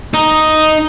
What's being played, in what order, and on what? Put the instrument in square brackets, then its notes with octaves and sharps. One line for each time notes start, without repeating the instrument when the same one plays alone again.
[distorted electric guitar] D#4